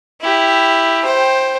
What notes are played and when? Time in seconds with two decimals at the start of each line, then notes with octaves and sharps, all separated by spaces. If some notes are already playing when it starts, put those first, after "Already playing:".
0.21 E4 G4
1.05 C5 G5